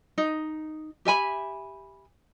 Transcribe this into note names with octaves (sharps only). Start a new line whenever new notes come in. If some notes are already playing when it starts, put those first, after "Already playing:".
D#4
G4 E5 G#5 B5